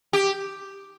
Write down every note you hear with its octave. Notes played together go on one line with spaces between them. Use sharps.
G4